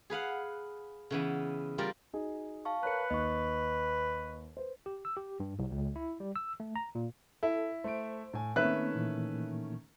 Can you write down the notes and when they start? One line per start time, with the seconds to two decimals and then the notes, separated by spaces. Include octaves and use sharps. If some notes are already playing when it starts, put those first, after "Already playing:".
0.10 G#4 B4 F5 F#5
1.11 C#3 E3 B3
1.78 G3 F4 A#4 D5
2.13 D#4 F#4 G#4
2.65 F5 A5 C#6
2.83 A#4 B4 C#5 A#5 F#6 C#7
3.10 D#2 D#5 C#6
4.57 B4 C5
4.86 G4
5.05 E6
5.17 G4
5.40 G2
5.59 C2
5.71 C#2
5.96 E4
6.20 G3
6.36 E6
6.60 A3
6.76 A#5
6.95 A#2
7.43 E4 A4
7.84 A3 C5 D7
8.33 A2 G#5
8.56 D#3 A3 A#3 C4 C#4 B4 E5 F#6
8.94 A#2 E3 A#3